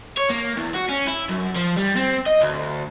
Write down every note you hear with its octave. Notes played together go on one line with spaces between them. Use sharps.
C#5
A#3
E2
F#4
C#4
E4
F#2
F3
G3
C4
D#5
D2